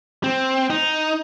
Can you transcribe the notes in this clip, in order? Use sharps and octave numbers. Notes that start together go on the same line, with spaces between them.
C4
D#4